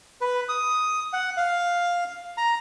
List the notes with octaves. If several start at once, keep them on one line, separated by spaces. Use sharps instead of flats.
B4
D#6
F#5
F5
A#5